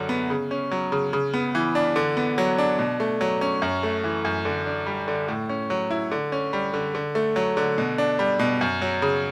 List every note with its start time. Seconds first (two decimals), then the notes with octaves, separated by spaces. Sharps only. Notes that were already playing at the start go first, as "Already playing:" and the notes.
Already playing: F#2 D3 F#3
0.09 B3
0.30 C#3
0.51 C#4
0.71 F#3
0.92 C#3
1.13 C#3
1.34 B3
1.55 E3
1.75 D4
1.96 D3
2.17 B3
2.38 F#3
2.58 D4
2.79 B2
3.00 A3
3.21 F#3
3.41 C#4
3.62 F#2
3.83 A3
4.04 E3
4.25 F#2
4.45 D3
4.66 D4
4.87 G3
5.08 D3
5.28 A2
5.49 C#4
5.70 F#3
5.91 E4
6.12 D3
6.32 C#4
6.53 G3
6.74 D3
6.95 D3
7.15 A3
7.36 F#3
7.57 D3
7.78 B2
7.98 D4
8.19 G3
8.40 B2
8.61 F#2
8.82 F#3
9.02 C#3